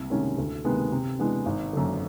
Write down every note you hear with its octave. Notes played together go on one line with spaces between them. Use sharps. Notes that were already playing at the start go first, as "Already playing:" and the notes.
Already playing: C2
C3 D#3 G#3 C#4
D2
C3 D#3 G#3 B3
C3
E3 G#3 B3 D4
G#1
F#2 D3